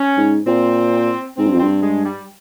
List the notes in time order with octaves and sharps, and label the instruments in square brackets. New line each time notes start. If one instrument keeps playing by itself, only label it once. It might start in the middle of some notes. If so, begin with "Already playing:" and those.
Already playing: [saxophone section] C#4
[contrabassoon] G#2
[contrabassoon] A#2 [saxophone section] C4
[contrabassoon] G#2 [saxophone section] C4
[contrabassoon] G2
F2
[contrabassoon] G2 [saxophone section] C4
[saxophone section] G#3
G3